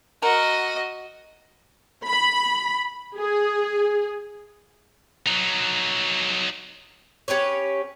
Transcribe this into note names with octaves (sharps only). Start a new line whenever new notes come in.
F#4 A#4 D#5
B5
G#4
F#3 D#4
C#4 G4 B4 C#5